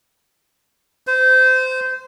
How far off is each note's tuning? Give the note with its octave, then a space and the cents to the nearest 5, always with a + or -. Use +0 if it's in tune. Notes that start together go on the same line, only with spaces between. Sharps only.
C5 -25